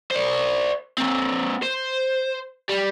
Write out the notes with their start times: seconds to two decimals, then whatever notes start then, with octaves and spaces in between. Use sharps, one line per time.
0.11 C5 D5
0.98 A#3 C4
1.63 C5
2.69 G3